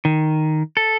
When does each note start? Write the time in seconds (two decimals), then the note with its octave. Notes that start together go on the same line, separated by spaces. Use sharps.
0.05 D#3
0.77 A4